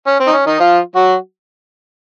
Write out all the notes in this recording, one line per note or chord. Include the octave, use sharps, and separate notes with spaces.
C#4
C4
D#4
C#4
D#3 D#4
F3 F4
F#3 F#4